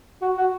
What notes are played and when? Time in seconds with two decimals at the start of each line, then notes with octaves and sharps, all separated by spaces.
0.22 F#4
0.37 F#4